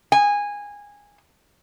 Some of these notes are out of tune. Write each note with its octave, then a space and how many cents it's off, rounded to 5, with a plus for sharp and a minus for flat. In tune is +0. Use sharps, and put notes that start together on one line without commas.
G#5 -15